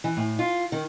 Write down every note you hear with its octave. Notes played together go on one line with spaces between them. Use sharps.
E3
A2
F4
D#3